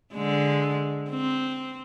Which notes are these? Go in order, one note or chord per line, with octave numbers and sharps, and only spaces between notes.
D3 G#3
C4